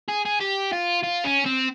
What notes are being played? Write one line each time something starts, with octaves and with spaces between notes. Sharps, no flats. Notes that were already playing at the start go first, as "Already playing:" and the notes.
G#4
G#4
G4
F4
F4
C#4
C4